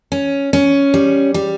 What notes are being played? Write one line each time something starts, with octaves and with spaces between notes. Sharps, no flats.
C#4
C#4
G3
G3